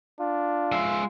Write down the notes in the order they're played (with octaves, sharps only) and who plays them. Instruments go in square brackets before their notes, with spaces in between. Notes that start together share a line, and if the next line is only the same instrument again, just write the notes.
[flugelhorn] D4 [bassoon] F4
[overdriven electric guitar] G#3 E5